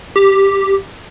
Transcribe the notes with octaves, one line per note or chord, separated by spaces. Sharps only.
G4